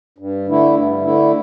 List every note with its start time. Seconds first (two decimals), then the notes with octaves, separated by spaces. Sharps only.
0.18 G2
0.48 D3 A3 E4
0.76 G2
1.03 D3 A3 E4